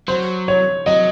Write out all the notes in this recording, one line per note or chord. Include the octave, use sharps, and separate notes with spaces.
F#3 C5
C#5
F#3 D#5